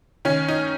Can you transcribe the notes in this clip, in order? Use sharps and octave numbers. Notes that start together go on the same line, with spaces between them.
D#3 C#4
D#4